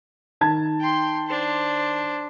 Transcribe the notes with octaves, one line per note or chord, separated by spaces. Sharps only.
D#3 A5 G#6
G5 C6
D4 C5